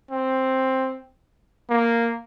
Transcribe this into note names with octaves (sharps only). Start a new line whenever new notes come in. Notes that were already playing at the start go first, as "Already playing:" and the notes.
C4
A#3